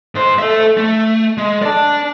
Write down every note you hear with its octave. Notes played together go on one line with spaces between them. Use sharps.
G#2 C5
A4 E5
A3
G#3
D5 A5